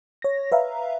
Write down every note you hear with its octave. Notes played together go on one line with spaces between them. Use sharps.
C#5 A#6
B4 E5 F5 A#5